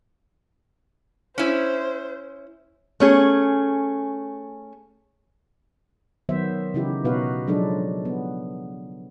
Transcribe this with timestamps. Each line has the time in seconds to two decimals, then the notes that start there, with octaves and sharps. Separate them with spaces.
1.38 C#4 E4 C5
3.00 A3 C#4 G#4
6.29 D#3 F#3 B3 C5 E5
6.74 C#3 E3 D#4 E4 G4
7.04 B2 B3 D#4 F#4 B4 F5
7.47 F3 F#3 G#3 D4 D#4 A4
8.05 B3